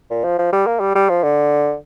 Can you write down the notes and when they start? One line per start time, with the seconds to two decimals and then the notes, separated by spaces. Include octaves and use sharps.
0.10 A#2
0.24 F3
0.39 F3
0.53 G3
0.67 A#3
0.80 G3
0.95 G3
1.09 F3
1.23 D3